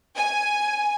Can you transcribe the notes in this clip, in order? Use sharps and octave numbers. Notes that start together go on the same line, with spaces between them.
G#5